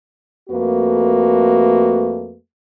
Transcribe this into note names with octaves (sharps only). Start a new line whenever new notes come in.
F2 A3 A#3 F#4 B4